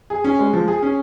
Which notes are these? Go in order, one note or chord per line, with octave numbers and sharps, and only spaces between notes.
G#4
C#4
G#3
F3
G#4
C#4